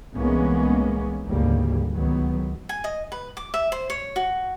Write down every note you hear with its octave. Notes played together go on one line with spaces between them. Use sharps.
C2 E3 G#3 A#3 B3 C#4
G#1 D2 G#2 C#3 G3 A#3
C#2 D#3 F#3 B3
G#5
D#5
B4
D6
E5
C5
C#5
F#4